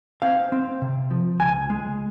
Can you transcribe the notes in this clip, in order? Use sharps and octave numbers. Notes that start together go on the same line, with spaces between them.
C4 F5
C4
C3
F3
C#2 G#5
G#3